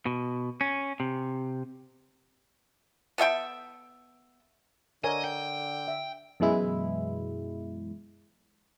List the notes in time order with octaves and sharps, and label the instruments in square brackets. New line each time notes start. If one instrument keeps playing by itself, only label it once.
[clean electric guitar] B2
C#4
C3
[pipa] B3 A4 E5 G5
[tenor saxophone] D3 [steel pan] A#4 C#5 G#5 [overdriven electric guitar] D#5
[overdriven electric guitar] G5
[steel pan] E5
[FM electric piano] F#2 B2 E3 G#3 E4